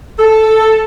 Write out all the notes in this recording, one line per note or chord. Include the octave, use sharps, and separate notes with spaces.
A4